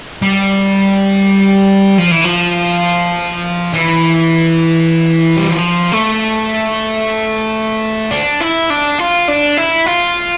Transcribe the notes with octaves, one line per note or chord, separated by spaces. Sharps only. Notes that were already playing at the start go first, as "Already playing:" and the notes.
G3
F3
E3
F3
E3
G3
F3
A3
D4
E4
D4
F4
D4
E4
F4